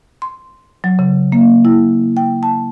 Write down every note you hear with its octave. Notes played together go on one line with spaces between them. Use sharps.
C6
F#3
C#3
A#3
E4
G5
A5